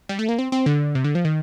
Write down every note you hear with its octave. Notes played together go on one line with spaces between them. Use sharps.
G3
A3
A#3
C4
C4
D3
C3
D3
F3
D#3